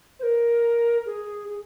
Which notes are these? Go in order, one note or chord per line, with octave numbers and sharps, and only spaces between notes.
C5
A#4
G#4
G#4